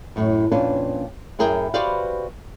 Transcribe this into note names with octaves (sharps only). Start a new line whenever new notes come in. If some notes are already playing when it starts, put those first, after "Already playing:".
F#2 A2
F2 A#2 C#4 D4 B4
F#2 E4 G#4 A#4 G5
F#4 G4 B4 C5 D5 F5